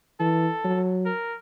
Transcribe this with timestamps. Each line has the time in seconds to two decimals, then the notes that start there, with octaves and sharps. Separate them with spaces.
0.20 E3 A4
0.64 F#3
1.06 A#4